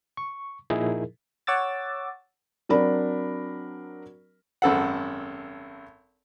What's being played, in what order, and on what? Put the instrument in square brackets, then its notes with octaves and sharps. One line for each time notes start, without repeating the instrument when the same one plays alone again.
[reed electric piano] C#6
A#2 F3 D#4 E4 G#4 A#4
[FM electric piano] C#5 F#5 D6 E6 A6
[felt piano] F#3 C4 D4 A#4 B5
[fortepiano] G#1 F#2 A4 F#5